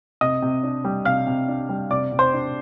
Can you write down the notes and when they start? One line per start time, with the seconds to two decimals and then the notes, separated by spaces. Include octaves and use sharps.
0.21 C3 D#5 D#6
0.42 C3
0.63 D4
0.84 G3
1.05 C3 F5 F6
1.27 C3
1.48 D4
1.69 G3
1.91 C3 D5 D6
2.12 C3
2.19 C5 C6
2.33 D4